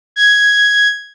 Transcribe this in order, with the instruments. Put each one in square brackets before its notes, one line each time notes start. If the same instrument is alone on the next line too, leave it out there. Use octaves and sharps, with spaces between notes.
[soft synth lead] G#6